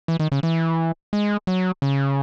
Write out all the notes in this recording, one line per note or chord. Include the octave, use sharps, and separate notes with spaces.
E3
D#3
C#3
E3
G#3
F#3
C#3